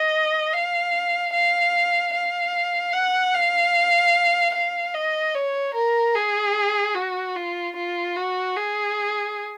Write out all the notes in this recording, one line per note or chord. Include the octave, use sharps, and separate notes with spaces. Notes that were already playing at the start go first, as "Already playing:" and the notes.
Already playing: D#5
F5
F5
F5
F#5
F5
F5
D#5
C#5
A#4
G#4
F#4
F4
F4
F#4
G#4